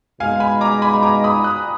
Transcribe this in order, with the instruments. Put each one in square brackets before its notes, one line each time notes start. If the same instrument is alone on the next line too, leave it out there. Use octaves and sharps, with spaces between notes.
[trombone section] B2 G#3 D#4 [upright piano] F5 G#5
[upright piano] G#5 B5
A#5 D6
G#5 B5
B5
A#5 D6
B5 D#6
D#6 F#6